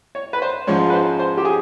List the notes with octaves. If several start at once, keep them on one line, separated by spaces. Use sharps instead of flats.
C#5
B4
C5
G#2 F3 G#3 C#4 C#5
B4
C5
C5
G4
G#4